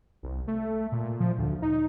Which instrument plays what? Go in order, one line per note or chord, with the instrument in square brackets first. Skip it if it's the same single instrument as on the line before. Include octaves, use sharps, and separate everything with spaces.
[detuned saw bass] C2
A3
A#2
F3
D2
D#4